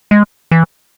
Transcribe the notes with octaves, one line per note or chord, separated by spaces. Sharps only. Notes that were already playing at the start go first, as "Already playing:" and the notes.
G#3
E3